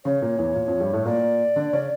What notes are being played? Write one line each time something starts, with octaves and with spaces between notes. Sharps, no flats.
C#3 C#4 C#5
A#2 A#3
E2 E3
A#2
F2 F3
G2 G3
A2 A3
A#2 A#3 D5
D3 D4
C#3 C#4